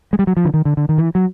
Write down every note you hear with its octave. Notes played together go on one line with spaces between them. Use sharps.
G#3
G3
F#3
F3
D3
D#3
D3
D3
D#3
E3
F#3